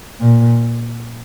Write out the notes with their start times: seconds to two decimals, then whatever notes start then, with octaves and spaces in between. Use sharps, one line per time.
0.21 A#2